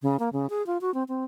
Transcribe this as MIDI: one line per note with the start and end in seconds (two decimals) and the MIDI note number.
0.03 0.17 49
0.19 0.29 58
0.33 0.49 49
0.50 0.65 68
0.67 0.78 65
0.81 0.93 66
0.94 1.04 60
1.08 1.24 60